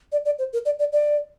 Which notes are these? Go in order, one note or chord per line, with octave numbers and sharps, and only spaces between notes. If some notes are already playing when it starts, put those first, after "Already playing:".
D5
D5
C5
A#4
D5
D5
D5